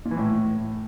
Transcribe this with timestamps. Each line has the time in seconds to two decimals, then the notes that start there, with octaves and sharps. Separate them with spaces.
0.05 A#2
0.11 E3
0.17 A2